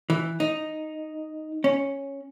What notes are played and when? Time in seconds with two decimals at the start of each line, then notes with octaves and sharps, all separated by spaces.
0.10 E3
0.40 D#4
1.64 C#4